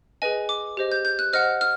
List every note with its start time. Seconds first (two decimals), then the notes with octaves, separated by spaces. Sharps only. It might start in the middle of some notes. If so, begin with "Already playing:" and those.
0.22 G#4 B4 D#5 G#5
0.49 D6
0.77 G4 C5 D#5
0.92 G6
1.05 G6
1.19 F#6
1.33 C5 D#5 F#5 F6
1.61 F6